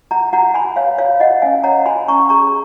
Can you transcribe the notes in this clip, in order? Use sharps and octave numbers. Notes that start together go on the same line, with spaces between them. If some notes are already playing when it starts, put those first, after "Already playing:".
F4 F#5 A#5
F4 F#5 A#5
F4 G#5 B5
B4 C#5 F5
F4 C#5 F5
F4 D#5 F#5
C#4 F5 G#5
C#5 F#5 A#5
F4 G#5 B5
C#4 A#5 C#6
G#4 A#5 C#6